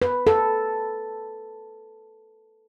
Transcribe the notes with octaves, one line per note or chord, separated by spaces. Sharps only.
B4
A4